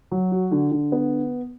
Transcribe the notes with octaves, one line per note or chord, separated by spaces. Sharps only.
F#3
F#4
D3
D3
B3